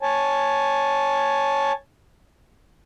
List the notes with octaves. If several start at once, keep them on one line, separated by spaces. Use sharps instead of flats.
C#5 G#5 A5